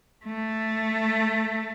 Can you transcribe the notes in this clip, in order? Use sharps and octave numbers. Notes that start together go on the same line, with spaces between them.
A3